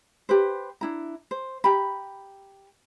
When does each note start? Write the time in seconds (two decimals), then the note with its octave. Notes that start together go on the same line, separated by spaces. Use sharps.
0.29 G4 B4 C5
0.81 D4 E4 A#5
1.31 C5
1.64 G4 A#5 B5